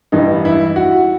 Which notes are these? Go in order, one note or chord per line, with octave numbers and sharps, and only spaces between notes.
A1 G2 E3 D#4
E4
F#4